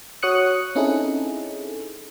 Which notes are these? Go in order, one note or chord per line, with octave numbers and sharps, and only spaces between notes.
F#4 C#5 D#6 F#6 C#7
C4 C#4 D#4 E4 G#4 A4